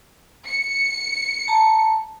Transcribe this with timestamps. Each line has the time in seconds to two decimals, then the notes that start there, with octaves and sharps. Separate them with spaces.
0.46 C#7
1.48 A5 A#5